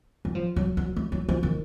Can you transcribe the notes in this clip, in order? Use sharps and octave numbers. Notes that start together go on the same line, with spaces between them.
F#3
F3
F#3
F#3
A3
F#3
F3
D#3